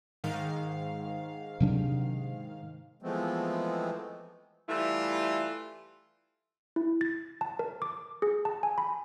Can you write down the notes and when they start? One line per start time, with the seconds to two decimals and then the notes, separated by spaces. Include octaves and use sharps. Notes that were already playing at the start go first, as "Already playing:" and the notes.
0.24 G#2 D#3 F5
1.60 C3 F#3 D4
3.03 E3 F3 G#3 A3 B3 C4
4.69 E3 G3 A3 E4 F4
6.76 E4
7.01 A6
7.41 A5
7.59 A#4
7.82 D6
8.22 G#4
8.45 A5
8.63 G#5
8.78 B5